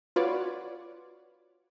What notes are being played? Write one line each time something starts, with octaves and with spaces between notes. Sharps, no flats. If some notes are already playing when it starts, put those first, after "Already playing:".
F4 F#4 B4 C#5 D5